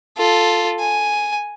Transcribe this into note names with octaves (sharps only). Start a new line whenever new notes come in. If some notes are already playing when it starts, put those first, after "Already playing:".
F4 A4
G#5